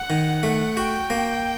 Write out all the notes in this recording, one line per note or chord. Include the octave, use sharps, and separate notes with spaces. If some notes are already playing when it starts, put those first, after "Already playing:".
Already playing: F#5
D#3
A3
F#4 G5
A#3